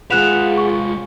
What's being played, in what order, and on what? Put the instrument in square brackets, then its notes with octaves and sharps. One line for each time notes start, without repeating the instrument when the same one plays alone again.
[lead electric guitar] G#3 B4 [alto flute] F4 [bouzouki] F#4 G#4 [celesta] F#6 E7 F7
[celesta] C#6